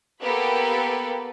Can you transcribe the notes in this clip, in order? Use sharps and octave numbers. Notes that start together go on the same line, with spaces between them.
A#3 B3 G4 A4 B4